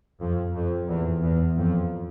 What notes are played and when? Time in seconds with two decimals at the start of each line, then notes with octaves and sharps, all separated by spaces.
0.21 F2
0.55 F2
0.89 E2
1.23 E2
1.57 F2